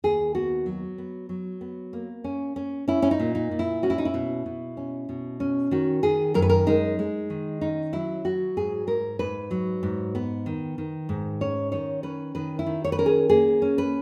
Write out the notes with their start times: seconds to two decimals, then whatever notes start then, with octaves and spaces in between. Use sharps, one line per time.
0.04 D#2 G#4
0.35 B3 F#4
0.66 F#3
0.98 B3
1.29 F#3
1.61 B3
1.93 A#3
2.24 C#4
2.56 C#4
2.88 C#4 E4
3.02 C#4
3.11 D#4
3.20 A#2
3.35 D#4
3.51 A#2
3.59 E4
3.83 C#4 F#4
3.90 E4
3.98 D#4
4.05 E4
4.14 B2
4.46 B2
4.77 C#4
5.09 B2
5.40 C#4
5.71 D#3 F#4
6.03 D#3 G#4
6.34 F#2 A#4
6.42 B4
6.50 A#4
6.67 G#3 D#4
6.99 G#3
7.30 D#3
7.61 C#4 D#4
7.92 F#3 E4
8.25 F#3 F#4
8.57 G#2 G#4
8.87 G#2 A#4
9.19 G#2 B4
9.51 F#3
9.83 G#2
10.15 B3
10.46 D#3
10.78 D#3
11.09 G#2
11.41 C#4 C#5
11.72 D#3 C#5
12.03 C#4 B4
12.35 D#3 B4
12.59 E4
12.66 D#3
12.84 C#5
12.92 B4
12.98 C#4 A#4
13.06 G#4
13.29 A#3 G#4
13.62 C#4
13.78 B4